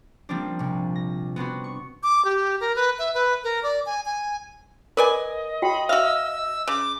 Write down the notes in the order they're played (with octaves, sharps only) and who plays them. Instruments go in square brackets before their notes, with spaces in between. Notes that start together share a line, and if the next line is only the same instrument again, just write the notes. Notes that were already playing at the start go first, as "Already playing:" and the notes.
[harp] F3 G3 A#3 C4 D4
A#1 C3
A#6
B3 C4 D4 F#4
C#6
[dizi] D6
G4
A#4
B4
E5
B4
A#4
D5
G#5
G#5
[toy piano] A#4 [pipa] B4 D5 G#5 [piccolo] D#5
[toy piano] F#4 G5 [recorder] B5
[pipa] F#4 F5 [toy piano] E5 [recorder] E6
[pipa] C#3 [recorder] D6